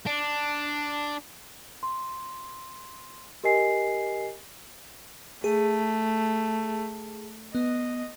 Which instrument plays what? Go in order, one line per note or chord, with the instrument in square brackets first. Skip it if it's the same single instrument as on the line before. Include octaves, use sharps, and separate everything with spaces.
[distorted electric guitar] D4
[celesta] C6
G4 A#4 D#5 G#5 C7
[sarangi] A3 [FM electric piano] G#4
[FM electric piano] B3 [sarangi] D#5